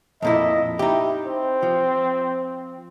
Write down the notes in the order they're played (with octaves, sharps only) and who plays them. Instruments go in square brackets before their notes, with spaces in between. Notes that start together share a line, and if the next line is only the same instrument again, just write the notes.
[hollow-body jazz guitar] F2 A#2 E4 [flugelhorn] D#5
[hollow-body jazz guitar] D#4 G4 [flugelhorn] E4
[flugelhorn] C4
[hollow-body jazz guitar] F3